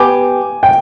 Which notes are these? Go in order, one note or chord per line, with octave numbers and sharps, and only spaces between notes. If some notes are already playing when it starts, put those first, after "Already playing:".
Already playing: B3 G4 G#5
G5